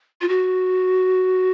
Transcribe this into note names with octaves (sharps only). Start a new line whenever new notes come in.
F4
F#4